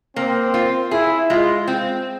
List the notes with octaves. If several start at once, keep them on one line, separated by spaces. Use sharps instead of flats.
A#3 C4
F4
E4 G#4
G#3 F4
C4